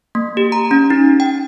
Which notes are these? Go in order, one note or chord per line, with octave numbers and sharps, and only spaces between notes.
A#3
G4
A#5
C#4
D#4
G5